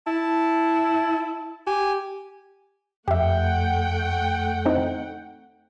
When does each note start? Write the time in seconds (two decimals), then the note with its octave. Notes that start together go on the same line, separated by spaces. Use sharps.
0.07 E4 A5
1.67 G4 G#5
3.08 F2 A3 G4 E5 F#5 G5
4.66 C4 D#4